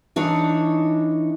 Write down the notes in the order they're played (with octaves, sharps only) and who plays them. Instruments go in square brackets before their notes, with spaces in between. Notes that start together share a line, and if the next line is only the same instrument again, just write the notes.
[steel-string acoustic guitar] E3 D4 D#4 C#5